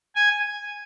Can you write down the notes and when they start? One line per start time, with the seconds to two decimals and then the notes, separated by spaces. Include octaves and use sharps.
0.16 G#5